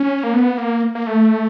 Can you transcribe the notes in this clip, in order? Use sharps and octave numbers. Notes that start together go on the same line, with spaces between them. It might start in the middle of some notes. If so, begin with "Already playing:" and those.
Already playing: C#4
A#3
B3
A#3
A#3
A3